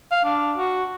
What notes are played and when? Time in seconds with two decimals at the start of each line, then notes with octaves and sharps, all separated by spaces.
0.11 F5
0.24 D4
0.57 F#4